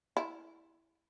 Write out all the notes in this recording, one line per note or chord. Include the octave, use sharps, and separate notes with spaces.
E4